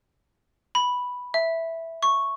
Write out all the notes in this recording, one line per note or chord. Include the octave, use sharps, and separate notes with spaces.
B5
E5
C#6